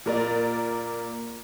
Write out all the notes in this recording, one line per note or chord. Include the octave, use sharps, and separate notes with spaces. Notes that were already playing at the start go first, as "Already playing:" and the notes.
A#2 A#4 D5